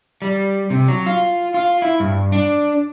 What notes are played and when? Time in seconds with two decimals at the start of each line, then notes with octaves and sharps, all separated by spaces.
0.22 G3
0.70 C3
0.88 F#3
1.06 F4
1.54 F4
1.82 E4
2.00 G2
2.32 D4